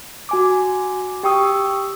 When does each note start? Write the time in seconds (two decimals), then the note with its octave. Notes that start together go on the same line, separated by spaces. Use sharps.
0.29 F#4 G#5 D6
1.23 G4 G5 C#6 D#6 E6